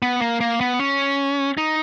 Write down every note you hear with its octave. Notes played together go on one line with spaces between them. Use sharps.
B3
A#3
A#3
B3
C#4
D#4